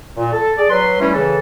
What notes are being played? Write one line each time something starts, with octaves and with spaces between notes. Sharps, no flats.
A#2
A4
G#4 D5
F#3 B4 C6
E3 G3 A3 C#4
C#3 E3 A4